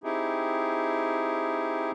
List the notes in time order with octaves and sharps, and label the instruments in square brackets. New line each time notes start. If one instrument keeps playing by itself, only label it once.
[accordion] C4 D#4 E4 G4 G#4